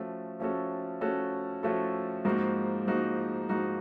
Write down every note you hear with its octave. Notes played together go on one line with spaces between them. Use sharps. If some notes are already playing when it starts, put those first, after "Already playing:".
Already playing: F3 A3 C#4 F#4 A4
F3 A3 C#4 F#4 A4
F3 A3 C#4 F#4 A4
F3 A3 C#4 F#4 A4
G#2 F3 A#3 D#4 F#4
G#2 F3 A#3 D#4 F#4
G#2 F3 A#3 D#4 F#4